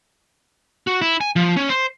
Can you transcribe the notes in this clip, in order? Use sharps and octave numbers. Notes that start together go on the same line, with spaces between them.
F#4
E4
G#5
F3
C#4
C5